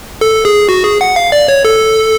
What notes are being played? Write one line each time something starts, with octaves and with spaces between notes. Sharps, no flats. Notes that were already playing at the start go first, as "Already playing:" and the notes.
A4
G#4
F#4
G#4
F#5
F5
D5
C#5
A4